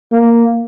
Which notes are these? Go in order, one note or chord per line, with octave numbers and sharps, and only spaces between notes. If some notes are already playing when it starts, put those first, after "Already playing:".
A#3